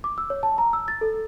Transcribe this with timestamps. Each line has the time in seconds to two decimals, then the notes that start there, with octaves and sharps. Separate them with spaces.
0.04 D6
0.18 E6
0.30 C#5
0.43 A5
0.58 A#5
0.73 E6
0.88 A6
1.01 A4